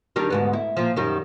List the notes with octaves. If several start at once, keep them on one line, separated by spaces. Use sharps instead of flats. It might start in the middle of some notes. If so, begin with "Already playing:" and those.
D#3 G3 D4
D2 G#2 B3
E4
A#2 F3
F#2 D#3 G3